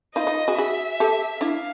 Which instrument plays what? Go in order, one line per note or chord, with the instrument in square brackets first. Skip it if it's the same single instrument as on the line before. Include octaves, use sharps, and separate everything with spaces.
[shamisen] D#4 F4 [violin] D#5
[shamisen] D#4 F4
F#4 G#4
[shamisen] F#4 G#4 [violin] E5
[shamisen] G4 A4
[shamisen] D4 E4 [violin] F5